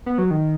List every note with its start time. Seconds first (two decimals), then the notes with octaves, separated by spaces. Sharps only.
0.06 B3
0.18 F#3
0.31 D#3